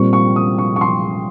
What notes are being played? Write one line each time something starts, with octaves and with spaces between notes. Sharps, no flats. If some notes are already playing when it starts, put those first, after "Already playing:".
Already playing: A#2 G3 C4 C#6
C#6
D#6
C#6
C#6
C6